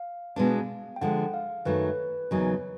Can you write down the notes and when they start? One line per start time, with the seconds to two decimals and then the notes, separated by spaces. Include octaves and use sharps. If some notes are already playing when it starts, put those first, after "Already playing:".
Already playing: F5
0.36 B2 G#3 B3 D4
0.96 G5
1.01 D3 F3 G#3 F#5
1.34 F5
1.65 F#2 D#3 F#3 A3 B4
2.31 E2 C#3 F#3 A#3 D#4